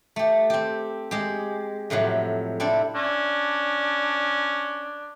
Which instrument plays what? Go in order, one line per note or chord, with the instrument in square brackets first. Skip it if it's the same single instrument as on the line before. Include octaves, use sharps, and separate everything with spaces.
[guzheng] A3 G4
C4 G4
G#3 G4
F2 A2 C3 F#3
C4 D4 E4 A4
[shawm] C#4 [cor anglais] D4